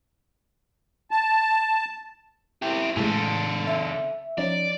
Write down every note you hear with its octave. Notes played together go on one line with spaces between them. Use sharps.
A5
E4 G4
A2 C#3 G#3 A4
E5
F3 C#4 D#4 D5